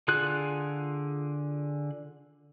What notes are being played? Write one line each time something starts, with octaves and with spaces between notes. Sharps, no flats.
D3 F4 G#4 F#6